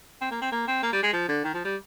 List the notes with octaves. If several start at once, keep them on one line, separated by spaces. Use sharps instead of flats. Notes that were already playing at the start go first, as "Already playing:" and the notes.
C4
A#3
C4
A#3
C4
A#3
G3
G#3
F3
D3
D#3
F3
G3